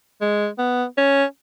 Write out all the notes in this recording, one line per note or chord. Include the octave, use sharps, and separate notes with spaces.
G#3
B3
C#4